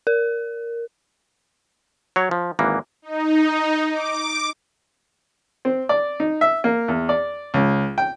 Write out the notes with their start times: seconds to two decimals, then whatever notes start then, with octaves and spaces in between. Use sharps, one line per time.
0.07 A#4
2.16 F#3 C#5
2.31 F3
2.59 G#1 E3 A#3 F#5
3.02 D#4
3.92 D6
5.65 C4
5.89 D5
6.20 D#4
6.41 E5
6.64 A#3
6.88 E2
7.09 D5
7.54 C#2
7.98 G5